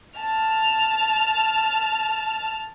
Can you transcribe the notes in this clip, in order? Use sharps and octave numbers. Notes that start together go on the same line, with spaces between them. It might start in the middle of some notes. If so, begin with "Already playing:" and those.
A5 F6